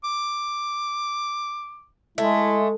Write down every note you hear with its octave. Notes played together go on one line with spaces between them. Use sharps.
D6
G#3 A3 E4